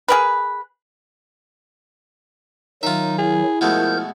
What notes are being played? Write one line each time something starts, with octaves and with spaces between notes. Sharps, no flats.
G#4 A#4 B4
D#3 F#3 D#4 F4 E5
E4 G#4
B2 F3 G#3 A3 A#4 G6